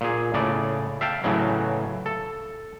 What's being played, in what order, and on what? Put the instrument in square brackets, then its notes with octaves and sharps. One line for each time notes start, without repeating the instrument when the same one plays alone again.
[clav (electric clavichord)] A#2 G#4
A2 C#3 D5
E5 F5 G5 A5
A2 C#3 E3 F#3
A4